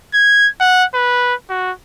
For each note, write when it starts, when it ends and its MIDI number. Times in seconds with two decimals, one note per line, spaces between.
0.13 0.48 92
0.60 0.84 78
0.94 1.34 71
1.49 1.71 66